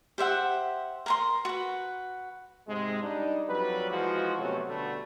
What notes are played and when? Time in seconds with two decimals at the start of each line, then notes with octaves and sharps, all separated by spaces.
0.18 G4 C5 E5 F#5
1.06 A#4 A#5 C6
1.45 F#4 B4
2.67 G#2 C3 G#3
3.02 G3 D4 D#4
3.48 F2 F#3 G3 B4
3.91 E3 F3 G#3 F#4
4.39 C3 F#3 A3 B3 C#4
4.68 B2 D3 G3 A3